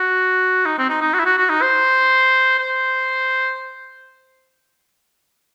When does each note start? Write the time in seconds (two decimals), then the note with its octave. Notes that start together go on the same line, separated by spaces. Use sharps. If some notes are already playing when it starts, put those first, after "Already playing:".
Already playing: F#4
0.66 D#4
0.78 C4
0.89 D#4
1.01 D#4
1.14 F#4
1.19 E4
1.25 F#4
1.38 F#4
1.50 D#4
1.62 C5
2.59 C5